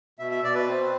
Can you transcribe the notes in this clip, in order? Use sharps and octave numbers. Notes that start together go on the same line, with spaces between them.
B2 E5
E5
B2 D5
B4
C4